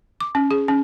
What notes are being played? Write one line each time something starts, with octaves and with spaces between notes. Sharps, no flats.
D6
C#4
G#4
C#4